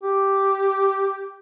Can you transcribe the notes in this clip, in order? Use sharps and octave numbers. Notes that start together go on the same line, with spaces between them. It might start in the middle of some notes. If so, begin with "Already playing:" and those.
G4